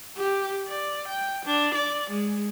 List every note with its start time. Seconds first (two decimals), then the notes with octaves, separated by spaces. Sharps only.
0.17 G4
0.67 D5
1.08 G5
1.45 D4
1.75 D5
2.10 G#3